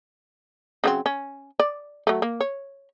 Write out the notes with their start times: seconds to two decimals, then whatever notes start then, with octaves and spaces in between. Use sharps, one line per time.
0.84 C#3 F#3 C4
1.06 C#4
1.59 D5
2.07 F#3 A3
2.22 A#3
2.40 C#5